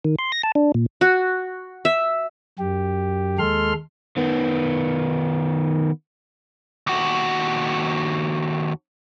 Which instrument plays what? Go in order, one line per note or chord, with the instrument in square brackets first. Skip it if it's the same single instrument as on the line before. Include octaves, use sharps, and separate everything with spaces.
[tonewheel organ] D#3
C6
A#6
A5
D4
A#2
[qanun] F#4
E5
[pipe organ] F#2 G4
D#2 G#3 A4 C6 F6
[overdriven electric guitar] D#3 B3
[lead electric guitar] D#2 F#4